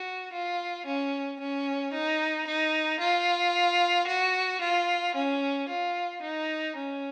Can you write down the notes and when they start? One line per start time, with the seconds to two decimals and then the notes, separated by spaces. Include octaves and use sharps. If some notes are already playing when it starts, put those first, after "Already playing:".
Already playing: F#4
0.33 F4
0.86 C#4
1.40 C#4
1.93 D#4
2.47 D#4
3.00 F4
4.07 F#4
4.61 F4
5.15 C#4
5.69 F4
6.22 D#4
6.76 C#4